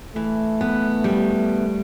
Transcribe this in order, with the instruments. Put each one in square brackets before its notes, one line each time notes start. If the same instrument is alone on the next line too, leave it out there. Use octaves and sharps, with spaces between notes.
[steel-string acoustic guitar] E3 [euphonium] A3
[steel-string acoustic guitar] B3
G3